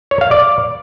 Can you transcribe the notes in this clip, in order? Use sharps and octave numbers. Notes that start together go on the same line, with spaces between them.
C#5
F5
D5